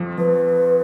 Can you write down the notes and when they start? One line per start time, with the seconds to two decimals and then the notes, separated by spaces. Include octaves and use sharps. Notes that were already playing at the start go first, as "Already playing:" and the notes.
Already playing: F2 F3
0.18 F3 B4